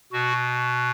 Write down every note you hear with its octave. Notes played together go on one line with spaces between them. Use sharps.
B2 F#4